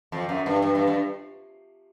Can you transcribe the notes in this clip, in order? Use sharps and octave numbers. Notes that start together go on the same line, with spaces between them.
F2
F#2
G2
G2
G2
G2